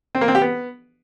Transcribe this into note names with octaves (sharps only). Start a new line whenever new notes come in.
C4
A#3
C4
G4
B3